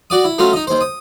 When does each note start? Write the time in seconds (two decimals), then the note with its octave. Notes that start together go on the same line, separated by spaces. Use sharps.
0.10 F#4 D5 D#6
0.24 E4
0.38 F#3 A3 C#4 F4
0.53 D#4 D#5
0.67 D#2 C5
0.81 D#6